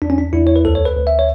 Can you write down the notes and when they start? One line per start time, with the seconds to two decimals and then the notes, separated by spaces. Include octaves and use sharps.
0.02 E2 D4
0.10 C#4
0.18 D4
0.33 E2 E4
0.47 C#5
0.56 B4
0.65 D2 A4
0.75 C#5
0.85 B4
0.97 D2
1.07 E5
1.19 C#5